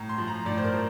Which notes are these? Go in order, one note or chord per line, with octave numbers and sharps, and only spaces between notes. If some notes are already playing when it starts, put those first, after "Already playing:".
Already playing: A2 A#5
C6
F3
A#5
A2 D5
C5
A#4
F3